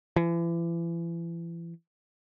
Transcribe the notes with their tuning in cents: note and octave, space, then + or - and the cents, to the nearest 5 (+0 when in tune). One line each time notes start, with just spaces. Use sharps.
E3 +35